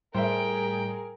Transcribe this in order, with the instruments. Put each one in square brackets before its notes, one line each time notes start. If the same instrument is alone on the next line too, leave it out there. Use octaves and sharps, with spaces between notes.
[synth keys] A2 G3 [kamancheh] G#4 A#4 [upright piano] C5 E5 [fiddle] G5